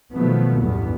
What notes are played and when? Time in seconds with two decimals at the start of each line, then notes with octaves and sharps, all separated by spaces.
0.13 B2 D#3 F3 F#3 A3 B3
0.60 A1 E2 G2 B3